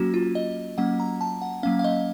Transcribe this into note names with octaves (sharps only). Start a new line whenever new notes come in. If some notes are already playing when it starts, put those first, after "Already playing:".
Already playing: F#3 A#3 C#4 F#4
F4
D#5
F#3 A#3 C#4 F#5
A#5
A5
F#5
F#3 A#3 C#4 F5
F5
D#5